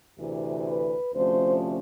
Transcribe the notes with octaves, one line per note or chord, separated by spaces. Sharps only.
D2 C3 E3
B4
D2 C3 F3 A3 C#4 C5